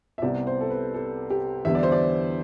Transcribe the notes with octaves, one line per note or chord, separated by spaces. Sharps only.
E5
C2 C3 G3 B3 D5
C5
A4
B4
A4
G4
E2 D3 G3 B3 E5
D5
C5
D5